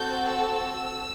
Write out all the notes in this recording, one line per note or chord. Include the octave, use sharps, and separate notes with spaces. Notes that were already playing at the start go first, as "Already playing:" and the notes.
Already playing: C4 F#4 A4 G6
E6